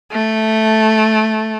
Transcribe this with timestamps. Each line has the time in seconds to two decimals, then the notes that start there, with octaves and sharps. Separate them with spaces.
0.12 A3